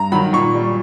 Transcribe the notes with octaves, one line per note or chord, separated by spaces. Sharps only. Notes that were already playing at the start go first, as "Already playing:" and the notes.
Already playing: G2 A#5
D#3 F#3 B5
A#2 C#6
G3